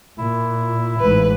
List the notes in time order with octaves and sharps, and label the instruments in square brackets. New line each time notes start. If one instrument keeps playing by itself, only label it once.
[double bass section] A#2 [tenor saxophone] E4
[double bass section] A1 G#2 [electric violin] B4